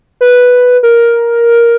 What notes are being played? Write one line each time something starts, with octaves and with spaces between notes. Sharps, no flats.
B4
A#4